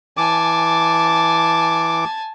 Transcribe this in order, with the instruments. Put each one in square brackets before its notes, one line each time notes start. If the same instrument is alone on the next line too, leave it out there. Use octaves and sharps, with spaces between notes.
[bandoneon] E3 D6 [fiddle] G#5 A5